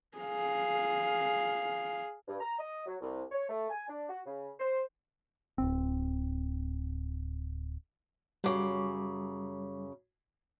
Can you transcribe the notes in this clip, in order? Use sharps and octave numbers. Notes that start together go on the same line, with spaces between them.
G#4 F5
G2
A#5
D#5
F#3
C2
C#5
A3
G#5
D4
F#4
C#3
C5
D1 G1 C4
F#2 C#3 G3 D6